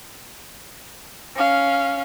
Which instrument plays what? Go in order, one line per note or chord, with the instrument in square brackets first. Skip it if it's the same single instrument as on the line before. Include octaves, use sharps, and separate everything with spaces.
[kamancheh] C#4 F5